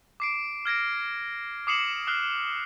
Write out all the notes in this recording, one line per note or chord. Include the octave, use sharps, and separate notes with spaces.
D6 C7 D7
F6 G#6 A#6 D7
D6 D#6 C7 C#7 E7 F#7
D#6 F6 F#6 C7